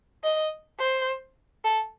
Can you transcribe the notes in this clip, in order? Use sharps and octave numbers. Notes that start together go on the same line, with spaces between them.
D#5
C5
A4